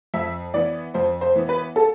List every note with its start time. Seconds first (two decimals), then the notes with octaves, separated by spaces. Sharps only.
0.14 F2 E5
0.54 E3 B3 D5
0.94 F2 C5
1.21 C5
1.36 E3 B3
1.49 B4
1.76 A4